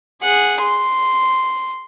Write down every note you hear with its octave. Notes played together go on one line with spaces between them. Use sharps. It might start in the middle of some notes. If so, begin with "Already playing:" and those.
G#4 F#5
C6